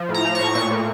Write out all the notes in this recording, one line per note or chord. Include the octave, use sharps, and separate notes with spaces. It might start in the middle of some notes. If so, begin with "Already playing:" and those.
Already playing: F3
A2
A#5
F3
C#6
A2
A#2 C#6
A#2